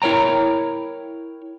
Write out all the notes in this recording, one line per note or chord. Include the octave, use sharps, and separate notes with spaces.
E4 A#4 C#5 G5 A#5